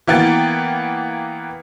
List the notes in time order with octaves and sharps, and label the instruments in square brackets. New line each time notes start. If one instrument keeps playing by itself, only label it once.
[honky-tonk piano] E3 A#3 B3 G5 A6